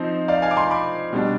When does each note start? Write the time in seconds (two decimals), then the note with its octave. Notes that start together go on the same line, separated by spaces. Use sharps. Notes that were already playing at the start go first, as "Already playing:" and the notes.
Already playing: F3 C4 D#4 C5 D#5
0.28 D5 F5
0.42 F5 G#5
0.51 D6
0.57 G#5 C6
0.70 B5 D6
1.13 B2 G3 D4